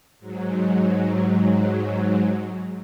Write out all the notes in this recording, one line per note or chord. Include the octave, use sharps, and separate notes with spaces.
G#2 F#3